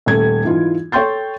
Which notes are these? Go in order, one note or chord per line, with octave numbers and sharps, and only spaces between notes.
D#1 A3 G#6
G#2 E3 F4
A4 C#5 G5 C6 G6 A6